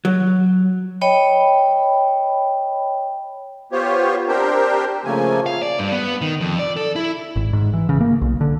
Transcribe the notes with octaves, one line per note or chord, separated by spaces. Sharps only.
F#3
C#5 D#5 G5 B5
B3 F4 G4 C5 C#5
C4 D4 G4 A#4 C5 G5
C#3 F3 A3 A#3 G#5
F5
D5
G2
B3
D#3
F2
D5
A4
E4
G#1
G#2
E3
C#3
A#3
B1
D3